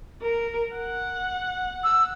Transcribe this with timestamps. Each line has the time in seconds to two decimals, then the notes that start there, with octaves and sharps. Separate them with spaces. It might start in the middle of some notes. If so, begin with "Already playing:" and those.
0.22 A#4
0.76 F#5
1.84 E6